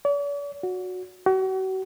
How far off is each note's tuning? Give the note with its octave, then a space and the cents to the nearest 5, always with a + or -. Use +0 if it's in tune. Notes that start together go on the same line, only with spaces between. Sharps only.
D5 -45
F#4 -15
F#4 +40